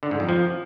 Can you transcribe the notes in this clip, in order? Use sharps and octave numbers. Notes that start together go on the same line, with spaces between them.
D3
G#2
F2
F3